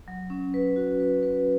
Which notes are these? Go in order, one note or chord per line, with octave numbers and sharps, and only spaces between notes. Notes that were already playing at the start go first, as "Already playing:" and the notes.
F#3
C#4
B4
F#4
B4
B4